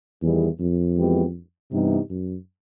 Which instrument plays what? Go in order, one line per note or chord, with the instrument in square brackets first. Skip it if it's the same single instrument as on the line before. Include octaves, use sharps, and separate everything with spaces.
[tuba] E2 [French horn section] D#3 G3 B3 E4 G#4
[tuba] F2
[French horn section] E3 G#3 B3 E4 G4
[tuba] G2 [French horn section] C3 E3 G3 B3 D#4
[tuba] F#2